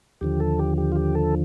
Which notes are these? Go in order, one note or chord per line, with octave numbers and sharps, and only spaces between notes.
D#2 D3 F3 G4
A4
G4
G4
F4
G4
A4